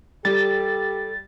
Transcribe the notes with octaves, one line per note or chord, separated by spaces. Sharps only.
G3 G4 A4 A6